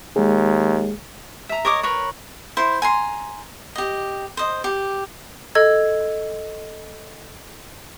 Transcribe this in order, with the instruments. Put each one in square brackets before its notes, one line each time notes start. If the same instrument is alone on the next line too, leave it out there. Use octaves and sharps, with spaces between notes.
[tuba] D#2 [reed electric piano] G#3 G#4
[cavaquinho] E5 A#5
A#4 C#5 D#5 D6
A#4 B4 C#5
E4 C5
G#5 A#5 C6
G4 D#5
C5 D#5
G4
[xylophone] A4 D#5 E6 G#6